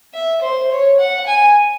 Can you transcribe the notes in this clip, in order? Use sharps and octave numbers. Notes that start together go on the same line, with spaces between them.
E5
C5
C#5
F#5
G#5